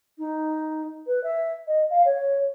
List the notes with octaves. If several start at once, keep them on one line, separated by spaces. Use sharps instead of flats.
D#4
B4
E5
D#5
F5
C#5